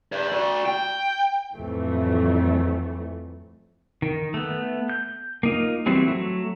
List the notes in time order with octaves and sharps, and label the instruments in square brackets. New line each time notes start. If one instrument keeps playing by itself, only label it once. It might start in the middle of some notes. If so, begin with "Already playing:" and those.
[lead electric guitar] B4 D5
F#4 D5
G5
[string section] F2 A2 E3 F#3 A3
[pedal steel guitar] D#3
A3 B3
G6
A#3 D#4 F4
E3 F#3 G3 C4 E4
F#3 A3